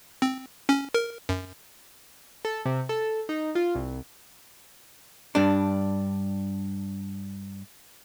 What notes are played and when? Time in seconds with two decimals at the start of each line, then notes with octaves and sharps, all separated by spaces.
0.22 C4
0.69 C#4
0.94 A#4
1.29 F#2
2.45 A4
2.66 C3
2.89 A4
3.29 D#4
3.55 F4
3.75 C2
5.35 G2 D4